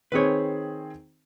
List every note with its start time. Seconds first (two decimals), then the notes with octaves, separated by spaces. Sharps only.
0.12 D#3 C4 G#4 B4 C#5